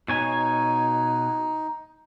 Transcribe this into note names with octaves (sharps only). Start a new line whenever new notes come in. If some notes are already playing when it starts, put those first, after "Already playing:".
B2 D#4 C#5 G#5